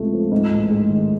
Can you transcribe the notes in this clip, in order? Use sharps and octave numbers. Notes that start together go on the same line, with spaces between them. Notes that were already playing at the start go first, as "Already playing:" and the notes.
Already playing: C#2 C3 A3
F3
G#2
A1
G#3
D#3